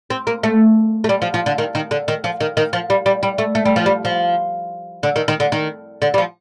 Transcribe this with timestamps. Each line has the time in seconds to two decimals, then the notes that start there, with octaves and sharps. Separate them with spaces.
0.10 C4
0.27 A#3
0.43 A3
1.04 A3
1.09 G3
1.22 F3
1.34 F3
1.46 D3
1.58 D#3
1.75 D#3
1.91 D3
2.08 D#3
2.24 F3
2.40 D#3
2.57 D#3
2.73 F3
2.90 G3
3.06 G3
3.23 G3
3.38 A3
3.55 A3
3.65 G3
3.76 F3
3.86 G3
4.05 F3
5.03 D3
5.16 D#3
5.28 D#3
5.40 D3
5.52 D#3
6.02 D3
6.14 G3
6.18 F3